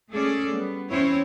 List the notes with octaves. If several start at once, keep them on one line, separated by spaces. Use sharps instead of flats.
G#3 A3 C#4 G#4 A4 D5
G3 B3
E2 C4 C#4 E4 C#5